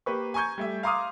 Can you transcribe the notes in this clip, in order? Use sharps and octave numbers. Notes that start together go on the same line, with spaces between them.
A#3 G4 B4 C#6
G#5 A#5 C#6 G6 G#6
G3 A3 E5
F5 A#5 C6 D6 D#6 F6